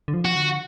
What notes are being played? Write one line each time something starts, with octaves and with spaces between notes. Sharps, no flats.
D3
F3
F#4
D3